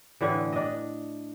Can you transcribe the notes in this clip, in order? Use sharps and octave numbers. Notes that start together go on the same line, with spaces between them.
A2 D3 E3
D4 D#5